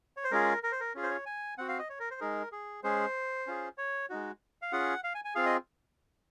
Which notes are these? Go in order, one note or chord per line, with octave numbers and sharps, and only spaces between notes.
C#5
C5
G#3 C#4 F4 G#4 A#4
A#4
C5
A#4
C#4 F4 G#4
C5
C#5
G#5
C4 F#4 F#5
F5
D#5
C#5
A#4
C5
G#3 D#4 G#4 A#4
G#4
G#3 C#4 G#4 C5
C#4 F4 G#4
C#5
G#3 D#4 F#4
F5
C#4 F4 G#4 F#5
F5
G#5
G#5
C4 F4 G#4 F5
D#5